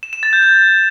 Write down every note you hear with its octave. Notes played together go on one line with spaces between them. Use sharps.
E7
E7
A6
G6
G6